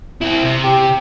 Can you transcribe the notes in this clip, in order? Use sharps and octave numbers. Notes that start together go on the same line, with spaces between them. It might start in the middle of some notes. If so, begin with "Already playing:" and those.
C4 E4
C3
G4